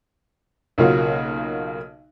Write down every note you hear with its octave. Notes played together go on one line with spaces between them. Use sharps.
B1 C#3 A#3 F4 F#4